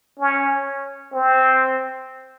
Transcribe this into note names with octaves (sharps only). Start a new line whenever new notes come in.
C#4
C4